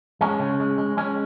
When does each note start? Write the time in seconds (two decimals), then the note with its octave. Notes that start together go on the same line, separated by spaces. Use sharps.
0.21 G#3 C#4
0.40 C#3
0.60 G#3
0.78 G#3
0.97 G#3 C#4